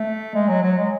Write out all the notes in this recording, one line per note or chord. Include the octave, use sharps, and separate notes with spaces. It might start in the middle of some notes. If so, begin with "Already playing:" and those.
Already playing: A3
G#3
F#3
F#3
G#3